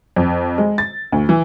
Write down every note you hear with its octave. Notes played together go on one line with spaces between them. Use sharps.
F2
G#3
A6
D2
E3